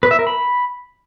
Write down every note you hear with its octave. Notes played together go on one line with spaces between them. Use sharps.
B4
E5
A#4
B5